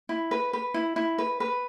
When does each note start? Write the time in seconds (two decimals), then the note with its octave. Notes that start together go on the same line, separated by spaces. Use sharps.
0.09 E4
0.31 B4
0.53 B4
0.74 E4
0.96 E4
1.18 B4
1.40 B4